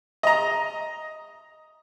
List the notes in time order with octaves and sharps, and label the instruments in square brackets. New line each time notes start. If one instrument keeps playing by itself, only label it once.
[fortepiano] D#5 A#5